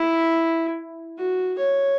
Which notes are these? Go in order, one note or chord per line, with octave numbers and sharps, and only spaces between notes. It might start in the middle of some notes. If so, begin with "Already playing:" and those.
Already playing: E4
F#4
C#5